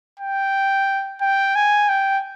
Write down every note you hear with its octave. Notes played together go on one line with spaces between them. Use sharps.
G5
G5
G#5
G5